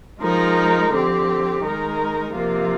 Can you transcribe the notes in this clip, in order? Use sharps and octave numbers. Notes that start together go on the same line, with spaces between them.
F3 G#3 D#4 A#4
D3 F3 C4 G4
D#3 G#3 D#4 A#4
C3 F3 A#3 F4